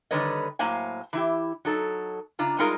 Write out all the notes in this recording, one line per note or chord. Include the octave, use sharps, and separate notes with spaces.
D3 D#3 G3 B4 C#5 D#5
A2 F#3 A#3 C5 F5 G#5
E3 E4 G4
F#3 D#4 A4
C#3 D4 F4 A#5
G3 G#3 D#4 F4 G#4 A#4